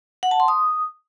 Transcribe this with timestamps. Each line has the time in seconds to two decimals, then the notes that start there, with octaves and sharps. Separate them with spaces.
0.23 F#5
0.31 A5
0.40 C6
0.48 D#6